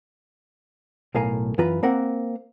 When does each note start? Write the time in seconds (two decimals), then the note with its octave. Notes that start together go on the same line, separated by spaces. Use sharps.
1.15 B1 A2 A#4 F5 G#5 A#5
1.58 F#2 E3 F4 B4 A#5
1.83 A#3 C4 A#4 F#5